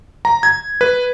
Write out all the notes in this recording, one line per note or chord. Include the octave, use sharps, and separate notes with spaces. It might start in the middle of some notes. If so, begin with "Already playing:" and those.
A#5
G#6
B4